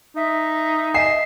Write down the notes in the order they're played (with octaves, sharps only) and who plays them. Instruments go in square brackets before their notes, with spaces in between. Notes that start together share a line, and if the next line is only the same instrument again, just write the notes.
[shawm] D#4 [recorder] E5
[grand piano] D#5 G#5 [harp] C7 E7